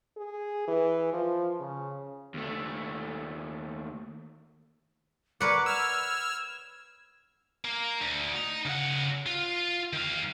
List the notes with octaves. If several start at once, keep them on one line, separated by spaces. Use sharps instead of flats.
G#4
E3
F3
C#3
D#2 A3
A#4 B4 C#5 D5 F#5 D6
E6 F6 G#6
A#3
D2
D#4
C#3 F#5
F4
D#3 F5